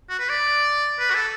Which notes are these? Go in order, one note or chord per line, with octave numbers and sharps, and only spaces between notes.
F#4
B4
D5
B4
F#4
A4